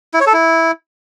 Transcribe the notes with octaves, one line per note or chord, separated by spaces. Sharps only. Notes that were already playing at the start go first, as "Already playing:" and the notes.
E4
C#5
A4
E4